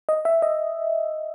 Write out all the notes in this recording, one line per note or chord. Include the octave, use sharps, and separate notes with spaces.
D#5
E5
D#5